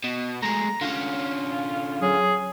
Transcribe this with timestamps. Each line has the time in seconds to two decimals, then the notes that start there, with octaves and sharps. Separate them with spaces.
0.04 B2
0.42 G#3 A3 A#5
0.81 D3 C#4 F4
2.02 F#3 G#4